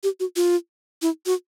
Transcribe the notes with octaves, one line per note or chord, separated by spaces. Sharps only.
G4
F#4
F4
E4
F#4